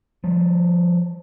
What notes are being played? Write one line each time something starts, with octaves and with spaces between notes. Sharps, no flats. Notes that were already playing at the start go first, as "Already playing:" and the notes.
F3 G3